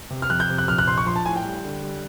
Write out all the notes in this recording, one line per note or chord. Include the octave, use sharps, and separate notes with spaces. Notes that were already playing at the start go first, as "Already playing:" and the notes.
C3
F6
F2 F#6
G6
C3
F#6
A#1 F6
F#6
A#1 C6
C#6
F3 C6
A5
A2 G#5
G5
G3
D3
G3